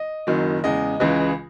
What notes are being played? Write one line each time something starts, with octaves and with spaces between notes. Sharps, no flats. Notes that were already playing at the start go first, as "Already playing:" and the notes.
Already playing: D#5
F#1 F#2 D#3 F#3
E2 C#3 G#3 D#5
C#2 C#3 E3 G#3